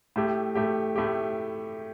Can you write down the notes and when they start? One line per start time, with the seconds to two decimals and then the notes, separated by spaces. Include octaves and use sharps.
0.16 A2 A3 G4
0.55 A2 A3 G4
0.96 A2 A3 G4